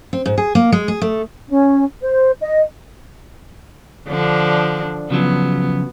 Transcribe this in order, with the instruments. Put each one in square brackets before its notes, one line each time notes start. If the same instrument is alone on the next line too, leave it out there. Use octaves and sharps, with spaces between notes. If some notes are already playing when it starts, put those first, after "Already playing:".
[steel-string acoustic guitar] C4
G#2
G#4
A#3
G#3
G#4
A3
[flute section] C#4
C5
D#5
[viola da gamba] D3 F3 D4
[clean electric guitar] C#3 F3 F#3 [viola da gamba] B3